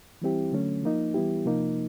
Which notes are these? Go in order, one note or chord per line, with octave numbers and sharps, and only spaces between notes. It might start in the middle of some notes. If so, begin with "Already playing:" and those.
E3 G3 C4 E4 G4
D3 F#3 A3 C#4
F3 A#3 D#4
E3 G3 B3 E4 G4
C3 F3 A#3 D#4